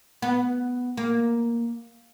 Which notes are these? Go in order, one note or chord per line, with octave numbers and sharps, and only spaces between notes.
B3
A#3